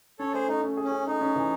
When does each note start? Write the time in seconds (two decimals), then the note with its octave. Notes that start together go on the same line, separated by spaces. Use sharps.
0.19 C#4 A4 C#5
0.34 A3 G#4 C5
0.48 A3 D#4
0.62 C#4
0.77 G#4
0.84 C#4
0.92 G#4
1.06 A3 D#4
1.21 C#4
1.36 E3